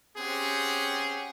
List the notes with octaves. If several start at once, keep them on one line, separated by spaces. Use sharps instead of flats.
C4 C#4 G4 G#4 F#5